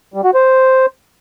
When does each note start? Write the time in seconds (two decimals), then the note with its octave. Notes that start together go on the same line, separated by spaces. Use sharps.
0.14 G3
0.24 F#4
0.34 C5